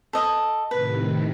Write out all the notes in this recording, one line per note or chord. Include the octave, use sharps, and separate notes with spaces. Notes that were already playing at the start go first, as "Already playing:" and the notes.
A4 D#5
A2 C3 D#3 B4